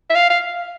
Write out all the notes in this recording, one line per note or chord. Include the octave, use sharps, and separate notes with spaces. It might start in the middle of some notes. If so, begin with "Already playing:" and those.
E5
F5
F5